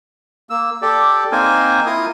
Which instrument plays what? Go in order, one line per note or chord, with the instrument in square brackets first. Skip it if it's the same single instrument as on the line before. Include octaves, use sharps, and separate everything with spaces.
[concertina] A#3 E6
G4 A4 D5
A#3 C4 D#4 A#4 C5 G#5
E4 F4 A#4 F5 D#6